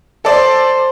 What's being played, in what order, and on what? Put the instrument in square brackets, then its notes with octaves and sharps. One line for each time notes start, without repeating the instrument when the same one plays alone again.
[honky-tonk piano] A4 D5 [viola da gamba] C5